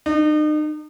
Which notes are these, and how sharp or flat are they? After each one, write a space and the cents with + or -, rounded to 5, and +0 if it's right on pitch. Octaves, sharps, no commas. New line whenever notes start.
D#4 -40